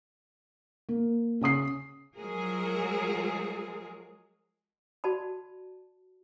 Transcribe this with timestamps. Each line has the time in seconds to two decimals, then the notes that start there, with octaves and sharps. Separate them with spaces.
0.89 A#3
1.41 C#3 C#4 D#6 C7
2.17 F3 F#3 G#3 G#4 A#4
5.04 F#4 D5 A5 B5